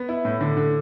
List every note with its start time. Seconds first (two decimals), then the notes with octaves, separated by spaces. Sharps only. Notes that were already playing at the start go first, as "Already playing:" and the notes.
Already playing: B3
0.09 E4
0.25 A2
0.41 D3
0.57 D3